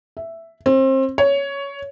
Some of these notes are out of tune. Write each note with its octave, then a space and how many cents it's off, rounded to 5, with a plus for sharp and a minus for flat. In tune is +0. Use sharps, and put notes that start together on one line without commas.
E5 +5
C4 +30
C#5 +10